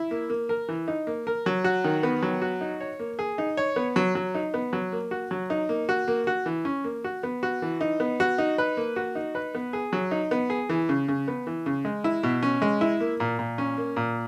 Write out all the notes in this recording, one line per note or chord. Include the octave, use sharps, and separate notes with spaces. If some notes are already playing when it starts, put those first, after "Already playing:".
Already playing: E4
A#3
A#3
A#4
E3
D#4
A#3
A#4
F#3
F#4
D#3
B3
F#3
F#4
D#4
C#5
A#3
G#4
D#4
C#5
B3
F#3
F#3
D#4
B3
F#3
A#3
F#4
F#3
D#4
A#3
F#4
A#3
F#4
E3
C#4
A#3
F#4
B3
F#4
E3
D#4
B3
F#4
D#4
B4
A#3
F#4
D#4
B4
B3
G#4
F#3
D#4
B3
G#4
E3
C#3
C#3
B3
E3
C#3
G#3
E4
B2
C#4
G#3
E4
A#3
A#2
A#2
C#4
A#3
A#2